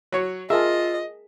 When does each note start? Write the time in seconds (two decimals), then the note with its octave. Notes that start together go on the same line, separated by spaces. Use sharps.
0.12 F#3 C#5
0.50 F4 G#4 A#4 D#5 E5 A5